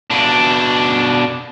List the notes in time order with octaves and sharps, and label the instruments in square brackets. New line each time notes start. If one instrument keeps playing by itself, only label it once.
[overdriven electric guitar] B2 D4